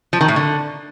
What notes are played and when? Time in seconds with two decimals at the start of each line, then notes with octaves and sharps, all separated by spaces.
0.13 F3
0.21 D#3
0.28 A2
0.36 D3